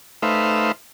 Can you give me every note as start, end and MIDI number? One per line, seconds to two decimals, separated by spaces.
0.22 0.72 57
0.22 0.72 63
0.22 0.72 71
0.22 0.72 72
0.22 0.72 76
0.22 0.72 77